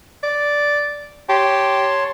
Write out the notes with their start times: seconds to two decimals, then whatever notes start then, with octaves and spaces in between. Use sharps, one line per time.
0.23 D5
1.29 G4 C#5 A5 C6